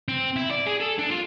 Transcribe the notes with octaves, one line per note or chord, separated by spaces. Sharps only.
C4
E4
D5
G#4
A4
D4
F4